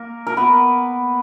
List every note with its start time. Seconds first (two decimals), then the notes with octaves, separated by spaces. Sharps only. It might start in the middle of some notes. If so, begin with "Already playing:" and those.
Already playing: A#3 A#4
0.27 A#4
0.37 B3 B4